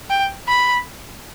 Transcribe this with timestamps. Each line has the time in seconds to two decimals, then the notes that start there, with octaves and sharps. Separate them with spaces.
0.10 G5
0.48 B5